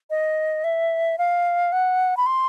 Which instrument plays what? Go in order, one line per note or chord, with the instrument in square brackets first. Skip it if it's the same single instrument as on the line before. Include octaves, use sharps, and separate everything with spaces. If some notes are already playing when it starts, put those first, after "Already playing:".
[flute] D#5
E5
F5
F#5
B5
C6